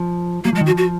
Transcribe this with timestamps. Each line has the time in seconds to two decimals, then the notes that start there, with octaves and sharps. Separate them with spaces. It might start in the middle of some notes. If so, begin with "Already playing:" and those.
Already playing: F3
0.44 F#3 A#3
0.53 F3 G#3
0.61 D#3
0.66 F3 F#4
0.77 F#4